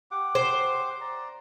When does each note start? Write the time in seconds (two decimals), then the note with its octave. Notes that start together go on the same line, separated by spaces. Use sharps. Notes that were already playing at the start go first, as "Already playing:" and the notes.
0.11 G4 F#5 D6
0.35 C5
1.01 D5 A#5